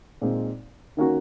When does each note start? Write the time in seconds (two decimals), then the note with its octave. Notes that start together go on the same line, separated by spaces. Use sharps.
0.21 A#2 G#3 C4 D#4
0.97 D#3 A#3 C#4 F#4